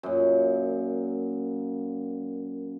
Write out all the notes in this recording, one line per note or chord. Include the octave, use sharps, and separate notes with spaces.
F#2 A#2